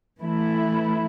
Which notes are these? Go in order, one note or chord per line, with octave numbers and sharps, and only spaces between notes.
E3 A3 E4